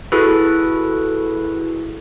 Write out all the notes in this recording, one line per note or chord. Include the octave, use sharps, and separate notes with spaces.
E4 F#4 G#4 A4 B4